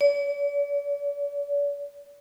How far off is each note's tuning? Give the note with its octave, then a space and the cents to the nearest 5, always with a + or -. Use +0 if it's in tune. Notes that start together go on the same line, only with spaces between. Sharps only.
D5 -45